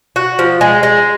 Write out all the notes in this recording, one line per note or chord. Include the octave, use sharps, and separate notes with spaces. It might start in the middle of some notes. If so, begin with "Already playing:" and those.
F#4
F3
G#3
G#3